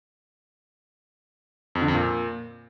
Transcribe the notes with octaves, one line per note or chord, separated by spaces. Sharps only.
F2
D3
F2
A#2